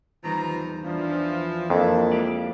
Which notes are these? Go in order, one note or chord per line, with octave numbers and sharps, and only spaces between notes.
E2 D#3 F3 G3 B4 A#5
E2 E3 F3 D4
F2 A#3 D4 E4
G#3 G4 D5